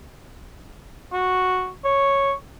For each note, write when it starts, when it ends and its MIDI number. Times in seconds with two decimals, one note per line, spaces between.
1.13 1.69 66
1.84 2.31 73